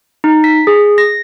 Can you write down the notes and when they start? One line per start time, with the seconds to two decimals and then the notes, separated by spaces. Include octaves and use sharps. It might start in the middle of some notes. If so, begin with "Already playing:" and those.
0.24 D#4
0.44 B6
0.67 G#4
0.98 A#6